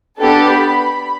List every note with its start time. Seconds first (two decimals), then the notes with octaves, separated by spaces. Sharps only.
0.19 B3 D4 G4 A4
0.53 B5